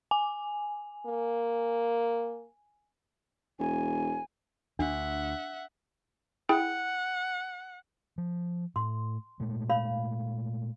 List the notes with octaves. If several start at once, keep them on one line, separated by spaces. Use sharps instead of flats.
G#5
A#3
E1 G#5
D2 D4 E5 F#5
E4 G#4 F#5 G5
F3
A2 C6
A#2 G#3 A3
C#5 F5 B5